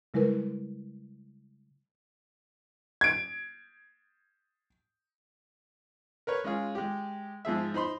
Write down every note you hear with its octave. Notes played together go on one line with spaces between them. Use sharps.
C#3 G3 G#3 E4 A#4 B4
G#6 D7
A#4 B4 C#5
G#3 C#4 F4 G#4
G#3 G4
G#2 F3 G#4 E5
D#4 C5 B5 C6